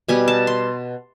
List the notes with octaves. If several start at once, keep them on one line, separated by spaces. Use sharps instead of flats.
B2 G3 B3 G#5
A5
C6